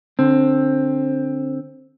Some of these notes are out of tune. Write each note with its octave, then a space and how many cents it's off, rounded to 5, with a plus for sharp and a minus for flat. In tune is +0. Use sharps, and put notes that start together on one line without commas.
D3 +0 C4 +15